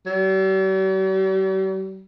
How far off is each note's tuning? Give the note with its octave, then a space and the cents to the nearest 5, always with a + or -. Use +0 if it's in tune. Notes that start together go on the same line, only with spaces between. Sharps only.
G3 -45